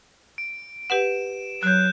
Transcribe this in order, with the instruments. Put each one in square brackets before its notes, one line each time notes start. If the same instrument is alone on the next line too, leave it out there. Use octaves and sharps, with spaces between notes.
[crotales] D7
[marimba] G4 B4 F#5 [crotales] E7
[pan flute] F#3 [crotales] F#6 G6